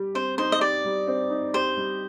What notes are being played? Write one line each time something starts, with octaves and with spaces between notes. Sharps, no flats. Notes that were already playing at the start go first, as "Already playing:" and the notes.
Already playing: G3 G4
C4 C5
D#4 C5
D#5
G4 D5
G3
C4
D#4
G4 C5
G3